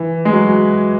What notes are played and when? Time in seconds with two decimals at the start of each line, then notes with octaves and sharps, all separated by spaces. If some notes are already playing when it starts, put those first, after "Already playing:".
Already playing: E3
0.25 G#3
0.33 F#3